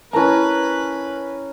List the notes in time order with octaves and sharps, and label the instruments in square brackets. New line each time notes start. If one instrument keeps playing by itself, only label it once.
[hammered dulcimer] C#4 A#5 [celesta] E4 A#4 A5 [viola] B4